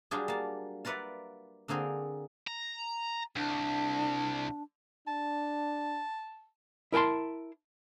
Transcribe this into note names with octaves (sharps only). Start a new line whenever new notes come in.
F#3 G3 D4 F4 G4 G#4
A#3 A5
F4 A#4 B4 D5 E5 F#5
D3 A#3 C4 G#4 A#4
A#5
C2 D4
D4 A5
E4 A#4 G5 A5 C6